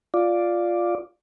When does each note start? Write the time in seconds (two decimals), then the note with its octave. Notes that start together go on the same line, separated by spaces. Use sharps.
0.14 F4 D5